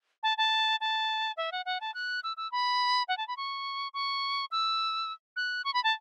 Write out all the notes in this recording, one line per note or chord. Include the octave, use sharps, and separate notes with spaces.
A5
A5
A5
E5
F#5
F#5
A5
F#6
E6
E6
B5
F#5
A5
B5
C#6
C#6
E6
F#6
C#6
B5
A5